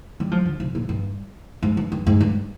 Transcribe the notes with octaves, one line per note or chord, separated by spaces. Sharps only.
G3
F3
D3
C3
A#2
G2
G#2
G2
G2
G#2
G2